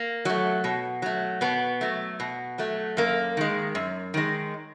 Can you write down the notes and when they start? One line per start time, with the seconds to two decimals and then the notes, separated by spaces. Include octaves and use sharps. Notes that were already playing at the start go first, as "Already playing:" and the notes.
Already playing: A#3
0.25 F#3 A3
0.64 B2
1.02 F#3 A3
1.41 B2 B3
1.81 F#3 A3
2.20 B2
2.58 F#3 A3
2.97 F#2 A#3
3.37 D#3 G#3
3.75 F#2
4.14 D#3 G#3